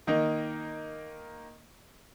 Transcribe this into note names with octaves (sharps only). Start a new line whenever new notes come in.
D#3 A#3 D#4